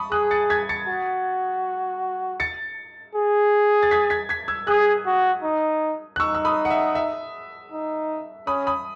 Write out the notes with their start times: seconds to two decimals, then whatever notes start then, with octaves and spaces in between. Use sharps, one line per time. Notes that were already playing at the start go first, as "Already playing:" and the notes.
Already playing: A5 B5 C#6 D#6
0.11 G#4 D#6 F#6
0.31 A6 C#7
0.50 G#6 B6
0.69 A6 C#7
0.88 F#4
2.40 A6 C#7
3.15 G#4
3.83 A6
3.91 G#6 B6
4.10 G#6 B6
4.29 G#6 B6
4.48 E6 G#6
4.67 G#4 D#6 F#6
5.06 F#4
5.43 D#4
6.16 F#6
6.19 D#4 C#6 E6
6.35 E6
6.45 B5 D#6
6.65 F#5
6.70 E5
6.95 E5
7.72 D#4
8.47 C#4 B5 D#6
8.67 B5 D#6